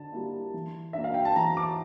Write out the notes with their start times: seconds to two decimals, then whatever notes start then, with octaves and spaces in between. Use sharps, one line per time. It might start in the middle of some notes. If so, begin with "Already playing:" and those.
Already playing: D3 A5
0.12 G3 A#3 E4
0.54 E3
0.93 A#3 D4 E5
1.04 F5
1.14 G5
1.25 A5
1.36 E3 A#5
1.57 D6